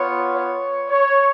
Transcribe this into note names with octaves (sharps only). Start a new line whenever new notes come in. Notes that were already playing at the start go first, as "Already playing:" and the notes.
Already playing: B3 F4 C#5
C#5
C#5